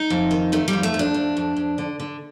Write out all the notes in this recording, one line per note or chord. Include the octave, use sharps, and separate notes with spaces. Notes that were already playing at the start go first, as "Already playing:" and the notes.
Already playing: D#4
F2
D#3
D#3 A3
G3
F2
A3
F2
D4
F2
F2
F2
D3
D3